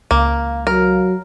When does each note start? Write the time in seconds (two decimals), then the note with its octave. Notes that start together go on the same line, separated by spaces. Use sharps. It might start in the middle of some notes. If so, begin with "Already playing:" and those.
0.11 C#2 A#3 F5
0.67 F#3 A#4